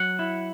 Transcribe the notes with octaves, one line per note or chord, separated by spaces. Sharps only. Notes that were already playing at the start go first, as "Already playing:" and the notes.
Already playing: F#3 F#5
E4